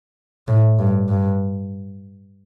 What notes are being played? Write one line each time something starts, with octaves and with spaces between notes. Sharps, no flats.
A2
G2
G2